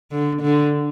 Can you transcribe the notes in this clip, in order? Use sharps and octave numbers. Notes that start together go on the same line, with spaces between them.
D3
D3